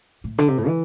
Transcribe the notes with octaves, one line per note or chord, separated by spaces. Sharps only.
A2
D3
C3
A2
E3